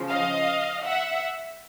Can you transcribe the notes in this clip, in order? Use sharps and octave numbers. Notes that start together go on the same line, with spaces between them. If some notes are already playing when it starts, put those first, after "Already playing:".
Already playing: C#3 F3
D#5 F5
E5 F#5